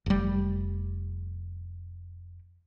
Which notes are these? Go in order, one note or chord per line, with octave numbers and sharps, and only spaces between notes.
F1 G3